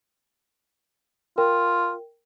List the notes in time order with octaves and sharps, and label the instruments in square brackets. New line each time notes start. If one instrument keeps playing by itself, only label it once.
[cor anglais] F4 [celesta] A#4 G5